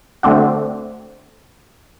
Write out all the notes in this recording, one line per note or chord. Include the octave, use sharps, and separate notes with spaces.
D3 A3 C4 D4 F#4